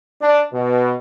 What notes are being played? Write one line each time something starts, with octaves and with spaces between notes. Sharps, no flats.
D4
B2